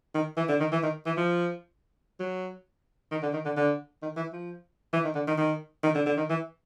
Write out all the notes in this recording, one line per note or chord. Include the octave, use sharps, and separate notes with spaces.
D#3
E3
D3
D#3
E3
D#3
E3
F3
F#3
D#3
D3
D#3
D3
D3
D#3
E3
F3
E3
D#3
D3
D#3
D#3
D#3
D3
D3
D#3
E3